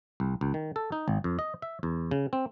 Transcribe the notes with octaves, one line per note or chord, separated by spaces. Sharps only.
C2
C#2
D#3
A4
D#4
G#1
F2
D#5
E5
E2
C#3
C4